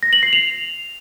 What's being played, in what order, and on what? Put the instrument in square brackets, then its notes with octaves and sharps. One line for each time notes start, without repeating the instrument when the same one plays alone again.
[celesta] A#6
F#7
C7
F7